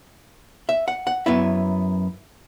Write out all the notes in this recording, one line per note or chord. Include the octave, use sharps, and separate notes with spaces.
E5
F#5
F#5
F#2 F#3 B3 E4 E5